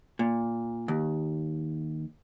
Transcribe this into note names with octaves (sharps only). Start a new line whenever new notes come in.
A#2
D#2